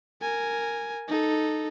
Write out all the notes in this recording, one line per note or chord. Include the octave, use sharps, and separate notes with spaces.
A#4 G#5
D#4 A4